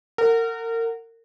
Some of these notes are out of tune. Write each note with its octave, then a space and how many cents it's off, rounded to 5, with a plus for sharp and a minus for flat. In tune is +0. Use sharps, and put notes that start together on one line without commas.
A#4 -30 F#5 +0